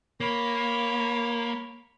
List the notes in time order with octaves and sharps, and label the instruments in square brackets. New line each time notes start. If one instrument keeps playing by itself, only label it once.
[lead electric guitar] A#3 [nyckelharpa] C#5 B5